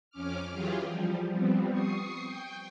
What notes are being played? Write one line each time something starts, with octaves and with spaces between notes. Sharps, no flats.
F2 C#4 D6 F6
E3 F#3 F4 G4 G#4
F3 G3
F3 G3 B3 C4
C#6 D#6 C7
G5